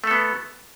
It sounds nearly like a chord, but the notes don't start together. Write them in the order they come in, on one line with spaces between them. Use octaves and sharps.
A3 A4 B3